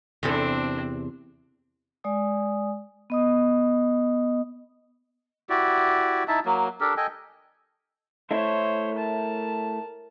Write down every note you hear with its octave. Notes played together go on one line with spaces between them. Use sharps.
E2 C3 C4 D4 A4
G#3 D5 G#5 D#6
B3 D#5 D#6
E4 F#4 G4 D5
D#4 E4 E5 A5
F#3 A#3
D4 G4 A4 A#4
A4 D#5 G5 G#5
A3 E4 C5 C#5 E5
A#4 A5